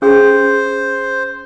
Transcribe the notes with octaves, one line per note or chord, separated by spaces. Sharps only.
C#4 G#4 C5